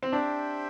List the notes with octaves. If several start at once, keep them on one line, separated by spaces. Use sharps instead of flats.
C4
D4 G4 C5 E5 G5